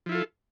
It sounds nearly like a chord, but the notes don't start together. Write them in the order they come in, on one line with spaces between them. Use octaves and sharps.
F3 E4 F4 A4